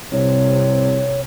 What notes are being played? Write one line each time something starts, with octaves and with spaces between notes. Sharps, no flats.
C2 C3 C#5